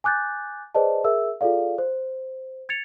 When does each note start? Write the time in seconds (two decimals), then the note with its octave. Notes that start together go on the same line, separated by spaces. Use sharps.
0.04 G#5 D6 F#6 G6 A6
0.75 G#4 B4 C5 D5 D#5 A5
1.04 G#4 A#4 E5 E6
1.41 F4 G#4 A4 D5 F5
1.78 C5
2.69 G#6 A6 C#7 F7